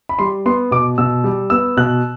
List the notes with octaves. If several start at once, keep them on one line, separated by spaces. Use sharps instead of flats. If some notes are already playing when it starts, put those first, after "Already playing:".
B5
G3 C6
B3 C6
B2 D6
B2 E6
G3
B3 E6
B2 F#6